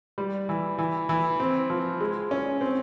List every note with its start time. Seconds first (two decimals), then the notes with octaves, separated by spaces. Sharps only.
0.18 G3
0.49 E3
0.78 E3
1.09 E3
1.40 C4
1.70 F3
2.01 G#3
2.31 C#4
2.61 C4